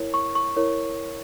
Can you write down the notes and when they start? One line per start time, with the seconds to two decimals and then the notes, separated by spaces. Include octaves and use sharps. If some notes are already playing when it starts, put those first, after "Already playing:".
Already playing: E4 A#4 C#5
0.14 C#6
0.35 C#6
0.56 E4 A#4 C#5